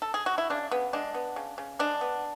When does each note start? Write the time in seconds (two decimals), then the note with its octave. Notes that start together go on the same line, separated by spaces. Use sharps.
0.02 A4
0.14 G#4
0.26 F#4
0.38 E4
0.50 C#3 D4
0.71 C#3 B3
0.93 G#3 D4
1.15 B3
1.36 C#3
1.58 C#3
1.79 G#3 D4
2.01 B3